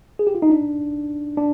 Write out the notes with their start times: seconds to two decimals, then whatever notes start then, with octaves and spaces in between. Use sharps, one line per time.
0.19 G#4
0.27 G4
0.35 F4
0.42 D#4
0.50 D4
1.37 D4